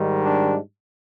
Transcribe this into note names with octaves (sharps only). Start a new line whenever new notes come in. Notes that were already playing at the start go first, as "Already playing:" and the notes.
Already playing: G#2 D#3 G3
D4